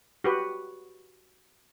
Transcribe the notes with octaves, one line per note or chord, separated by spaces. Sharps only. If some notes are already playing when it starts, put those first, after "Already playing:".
F#4 G4 B4